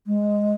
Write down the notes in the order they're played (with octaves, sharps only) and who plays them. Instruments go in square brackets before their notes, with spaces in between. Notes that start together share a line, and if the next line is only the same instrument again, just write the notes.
[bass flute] G#3